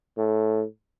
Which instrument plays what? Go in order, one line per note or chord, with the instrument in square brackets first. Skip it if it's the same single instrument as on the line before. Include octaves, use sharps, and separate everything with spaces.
[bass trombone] A2